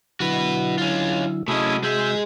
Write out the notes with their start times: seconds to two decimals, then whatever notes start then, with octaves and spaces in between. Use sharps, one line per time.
0.20 D3 F#3 E4 F#4 B4
0.78 C#4 F4
1.48 C3 A3 C#4 E4 F#4 G#4 D#5
1.83 G#3 G#4 E5 G6